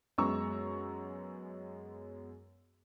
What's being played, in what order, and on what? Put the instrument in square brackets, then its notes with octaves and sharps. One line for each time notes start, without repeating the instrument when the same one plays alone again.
[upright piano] F#2 G#3 B3 A#5 C#6 E6